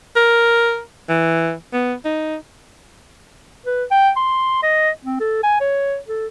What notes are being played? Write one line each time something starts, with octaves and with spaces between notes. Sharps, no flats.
A#4
E3
B3
D#4
B4
G5
C6
D#5
C4
A4
G#5
C#5
A4